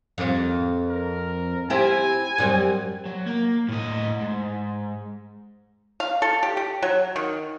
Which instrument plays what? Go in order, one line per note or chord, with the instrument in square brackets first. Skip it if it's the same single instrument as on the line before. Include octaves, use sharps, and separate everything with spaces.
[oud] F2
[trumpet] A#4
[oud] C4 E4 G4 [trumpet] G#5
[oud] F#2 G3 C4
[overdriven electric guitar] F#3
A#3
A2 D#5
G#2
[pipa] F5
A4
G4
G4
F#3
D#3